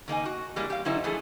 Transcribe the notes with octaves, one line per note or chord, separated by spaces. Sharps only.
D#3 A#3 D#4 G#5
F#4
E3 G3 G#3 A#3
G4 F5
D3 F#3 C#4 D#4 E4 C5
E3 F3 A3 G#4 A4